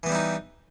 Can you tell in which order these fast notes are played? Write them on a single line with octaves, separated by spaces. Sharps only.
E3 B3 G3 E4 D#4